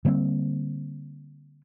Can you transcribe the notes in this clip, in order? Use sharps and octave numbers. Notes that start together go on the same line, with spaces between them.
D3 G3 A#3 C4